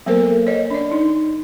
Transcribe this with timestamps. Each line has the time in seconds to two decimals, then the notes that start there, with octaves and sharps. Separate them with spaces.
0.06 F#3 A#3 B3 A4 A#4 C5
0.47 C#5 D#5
0.70 D4 D5
0.92 D#4